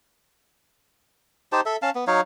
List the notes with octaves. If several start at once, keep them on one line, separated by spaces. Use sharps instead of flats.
D#4 G4 C5 A5
A4 E5
C#4 F5 A5
B3
F#3 D#4 C#5 F5